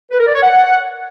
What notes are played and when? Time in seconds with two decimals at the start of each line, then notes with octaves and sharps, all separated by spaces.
0.11 B4
0.19 A#4
0.27 D5
0.35 C#5
0.43 F#5